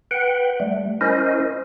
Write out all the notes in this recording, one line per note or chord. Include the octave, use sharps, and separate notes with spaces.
B4 F#5 G5
G3 A3
C#4 E4 A#4 C5 D#5